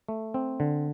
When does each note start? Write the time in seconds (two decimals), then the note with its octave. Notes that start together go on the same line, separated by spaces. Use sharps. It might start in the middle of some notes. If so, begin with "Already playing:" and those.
0.09 A3
0.34 C4
0.60 D3